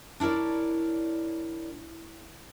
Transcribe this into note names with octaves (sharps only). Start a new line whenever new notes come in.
D4 E4 A#4 C#5 D5